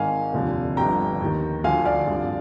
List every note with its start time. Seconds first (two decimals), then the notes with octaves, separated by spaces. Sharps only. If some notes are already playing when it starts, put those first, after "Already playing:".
Already playing: G#1 G#2 D#3 F5 G#5
0.33 F1 D#2 D3 F3
0.77 G1 G2 D3 F3 G5 A#5
1.20 D#2 D#3
1.64 D2 D3 F3 F5 G#5
1.85 D5 F5
2.07 G#1 G2 D3 F3